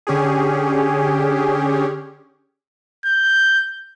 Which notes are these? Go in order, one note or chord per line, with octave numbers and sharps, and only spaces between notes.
D3 C#4 G4 G#4
G6